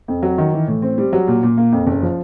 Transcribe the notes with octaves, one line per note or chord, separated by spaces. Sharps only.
F2
F#3
D#3
E3
A2
C4
G3
F#3
A#2
A#2
A#3
F2
F#1
F3